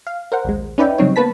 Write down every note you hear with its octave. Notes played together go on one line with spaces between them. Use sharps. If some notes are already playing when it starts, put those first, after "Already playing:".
F5
A#4 C5 F#5
A#1 D#2 G#3
C#4 D#4 B4 D5 E5 G5
C#3 F#3 G3 C4 D#4 C#5
A#3 B3 B4 A5 B6